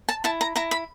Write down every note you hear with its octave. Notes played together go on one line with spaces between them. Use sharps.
A5
E4 A5
A#5
E4 A#5
B5